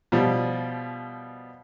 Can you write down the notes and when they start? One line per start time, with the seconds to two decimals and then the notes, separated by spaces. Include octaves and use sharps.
0.12 B2 F3 G3